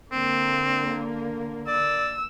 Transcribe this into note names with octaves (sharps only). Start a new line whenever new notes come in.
D3 A#3 C4
D5 E6